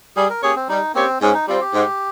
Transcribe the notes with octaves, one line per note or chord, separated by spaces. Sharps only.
G3 G#4
A#4
A#3 C#4 G4 G#4 C#5
C4
G3 D#4
A#3 C4 C#4 G4 C#5
G#2 C#4
D#4
G3 C4 F4
G4
G#2